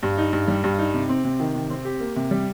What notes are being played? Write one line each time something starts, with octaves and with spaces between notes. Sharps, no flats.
G2
D#4
G2
G3
G2
D#4
C3
C4
C3
D#3
C3
C4
G4
A#3
C3
G3